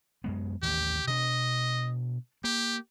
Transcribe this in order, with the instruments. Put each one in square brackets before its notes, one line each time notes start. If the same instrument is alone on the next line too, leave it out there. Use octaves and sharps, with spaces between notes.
[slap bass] F#2 G#3 B3
[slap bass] A1 D#2 [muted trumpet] G4
[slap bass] B2 D4 [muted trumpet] D#5
[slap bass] A#3 [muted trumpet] G4